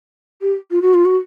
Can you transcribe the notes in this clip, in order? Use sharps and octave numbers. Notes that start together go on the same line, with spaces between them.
G4
F4
F#4
F4
F#4